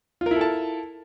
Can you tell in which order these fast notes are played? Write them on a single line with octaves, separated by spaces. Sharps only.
F4 A#4 E4 A4 A5